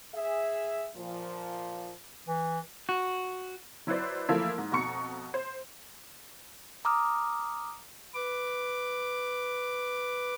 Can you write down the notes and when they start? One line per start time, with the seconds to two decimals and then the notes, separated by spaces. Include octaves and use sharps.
0.15 G#4 E5
0.97 A#2 F3
2.28 E3
2.89 F#4
3.87 F#3 E4 B4 C5 D5
4.29 E3 F3 A3 A#3 E4 F4
4.58 G#2
4.72 F2 B2 A#5 C#6 C#7
5.34 C5
6.85 A#5 D6 D#6 F6
8.14 B4 D6